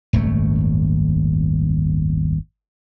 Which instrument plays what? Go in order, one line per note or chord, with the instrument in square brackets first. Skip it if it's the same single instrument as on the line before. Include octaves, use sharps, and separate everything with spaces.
[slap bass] D#1 G#1 F#2 A3